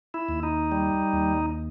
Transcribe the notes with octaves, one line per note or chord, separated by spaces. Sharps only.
E4
D#2
D#4
G3
D#2